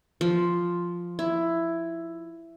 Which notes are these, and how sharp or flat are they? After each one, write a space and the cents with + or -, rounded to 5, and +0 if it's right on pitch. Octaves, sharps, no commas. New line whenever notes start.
F3 +0
E4 +10